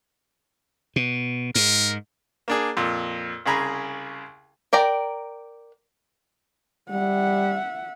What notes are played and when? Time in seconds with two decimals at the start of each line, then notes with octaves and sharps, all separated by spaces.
0.96 B2
1.55 G#2 A#4
2.48 A#3 D4 G#4
2.77 F2 A#2
3.46 C2 C#3 G#4 A#5 B5
4.73 A#4 D5 G5 A#5
6.90 G3 E5 F#5